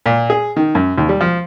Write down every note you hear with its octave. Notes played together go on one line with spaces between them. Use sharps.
A#2
G#4
D#3
F#2
D#2
G3
F3